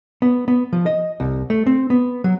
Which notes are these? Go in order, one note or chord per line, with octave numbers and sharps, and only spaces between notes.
B3
B3
F3
D#5
C2
A3
C4
B3
F#3